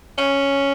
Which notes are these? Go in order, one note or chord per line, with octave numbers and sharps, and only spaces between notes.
C#4